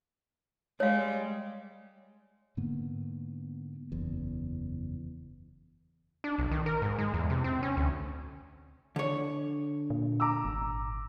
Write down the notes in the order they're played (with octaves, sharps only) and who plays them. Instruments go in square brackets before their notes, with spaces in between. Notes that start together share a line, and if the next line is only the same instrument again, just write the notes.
[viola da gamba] G3 G#3 [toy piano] C#5 F5
[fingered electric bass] G#2 D3 A#3 B3
F#1 E2
[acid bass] D4
B1
D#3
A#4
G#2
G#3
E2
C3
C4
C#4
D2
[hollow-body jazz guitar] D3 C#5
[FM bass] A#2
[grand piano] A#5 D6 E6
[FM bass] G#1